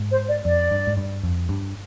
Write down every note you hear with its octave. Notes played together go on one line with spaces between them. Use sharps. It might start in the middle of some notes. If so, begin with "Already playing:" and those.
Already playing: G#2
C5
D5
F2 D5
G2
G#2
G2
F2
G2